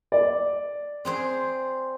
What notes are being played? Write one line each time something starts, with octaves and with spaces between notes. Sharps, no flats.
D5
C4 G#4 C5